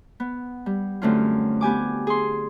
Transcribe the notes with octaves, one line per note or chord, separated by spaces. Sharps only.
B3
G3
F#2 D3 A3 C4 C#4 F4
B3 G4 G#5 D6
G#4 C6